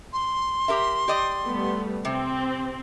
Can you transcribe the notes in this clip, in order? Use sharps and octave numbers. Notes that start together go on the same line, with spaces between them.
C6
G4 A#4 E5
G4 D5 D#5
G3 A3 B3
C3 C4